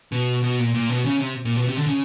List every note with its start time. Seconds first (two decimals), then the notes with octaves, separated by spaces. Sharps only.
0.12 B2
0.43 B2
0.59 A#2
0.75 A#2
0.89 B2
1.05 C#3
1.20 C3
1.45 A#2
1.56 B2
1.67 C3
1.77 D3
1.87 C#3